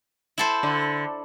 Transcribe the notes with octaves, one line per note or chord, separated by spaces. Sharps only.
E4 A4 C5
D3